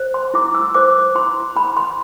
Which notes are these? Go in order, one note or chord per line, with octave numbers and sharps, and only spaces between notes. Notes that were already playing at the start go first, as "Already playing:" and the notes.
Already playing: C5
C6
E4 D6
E6
C5 D6
E4 C6
E4 B5
C6